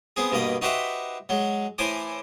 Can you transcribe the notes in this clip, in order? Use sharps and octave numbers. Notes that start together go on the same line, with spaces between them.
B3 C4 G#4
G2 B2 A#3 D#5
D#4 F#4 G4 B4 C5 E5
F#3 G#3
A2 E3 C5 G#5 D6